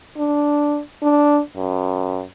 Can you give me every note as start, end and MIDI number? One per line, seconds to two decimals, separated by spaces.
0.18 0.80 62
1.03 1.41 62
1.57 2.23 42